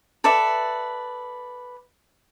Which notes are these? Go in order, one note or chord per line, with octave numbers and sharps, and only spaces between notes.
A4 B4 D5 E5